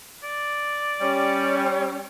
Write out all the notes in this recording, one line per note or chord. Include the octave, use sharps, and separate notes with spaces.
D5
G3 C#4